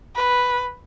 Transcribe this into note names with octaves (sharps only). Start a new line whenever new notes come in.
B4